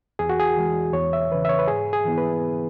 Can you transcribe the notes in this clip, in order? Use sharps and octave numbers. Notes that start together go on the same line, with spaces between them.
E2 G#4
F#4
G#4
E3 G#3
E2 C#5
E5
C#3 E3 B4
E5
C#5
B4
G#2 G#4
G#4
E3 B3 E4
B4